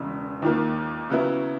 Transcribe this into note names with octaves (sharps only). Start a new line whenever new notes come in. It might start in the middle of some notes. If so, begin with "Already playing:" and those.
Already playing: E1 E2 C#3
D#2 D#3 A#3
C#3 F#3 B3 E4